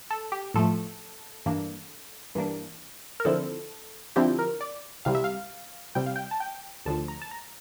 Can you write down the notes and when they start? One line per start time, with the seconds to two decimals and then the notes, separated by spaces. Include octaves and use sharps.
0.11 A4
0.32 G4
0.54 A2 F3 A3 A4
1.46 G2 E3 A#3 D4
2.35 G2 E3 A#3 D4
3.20 A#4
3.25 D3 F3 C4 E4 A4
4.16 D3 F3 C4 E4 G4
4.39 A#4
4.61 D5
5.05 C2 C3 G3 F5
5.15 E5
5.24 F5
5.95 C2 C3 G3 G5
6.06 F5
6.16 G5
6.31 A5
6.40 G5
6.85 D2 D3 F3 A5
7.08 A#5
7.22 A5
7.31 A#5